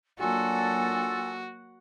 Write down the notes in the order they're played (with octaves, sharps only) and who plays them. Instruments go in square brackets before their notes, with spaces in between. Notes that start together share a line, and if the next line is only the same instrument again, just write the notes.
[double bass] F#3 A#3 [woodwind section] D4 F4 A4 [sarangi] F#4 [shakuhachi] G#5